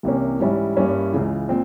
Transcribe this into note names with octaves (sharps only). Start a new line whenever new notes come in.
C2 C3 E3 A#3 C#4
G#2 E3 G3 C#4 E4
G2 G3 A#3 C#4 E4
C#2 C#3 E3
A#2 C4